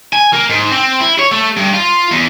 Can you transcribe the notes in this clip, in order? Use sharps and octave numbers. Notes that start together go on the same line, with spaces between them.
G#5
A#3
G#2
C4
E4
C#5
A3
G2
F4
E2